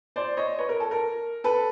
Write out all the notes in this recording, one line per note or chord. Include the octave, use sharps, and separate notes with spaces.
C5 D5
C#5 D#5
B4 C#5
A#4
A4
A#4
A4 B4